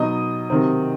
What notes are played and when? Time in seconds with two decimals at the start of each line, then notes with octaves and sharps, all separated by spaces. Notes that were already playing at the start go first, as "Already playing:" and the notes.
Already playing: B2 F#3 B3 D#4 D#5 D#6
0.50 C3 D#3 F#3 C4 D#4